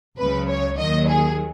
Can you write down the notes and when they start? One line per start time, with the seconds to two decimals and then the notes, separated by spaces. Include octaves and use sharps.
0.17 C#2 C#3 F#3 B4
0.48 C#5
0.78 D#2 D#3 F#3 D#5
1.08 G#4